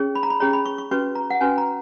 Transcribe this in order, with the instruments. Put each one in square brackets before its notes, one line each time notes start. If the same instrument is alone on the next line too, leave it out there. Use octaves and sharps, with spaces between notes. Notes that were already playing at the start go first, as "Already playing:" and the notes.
Already playing: [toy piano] C#4 G#4 C#5
B5
A#5
B5
C#4 G#4 C#5 A#5
B5
C#6
C#6
C#4 F#4 B4 C#6
A#5
F#5
C#4 F#4 B4 G#5
A#5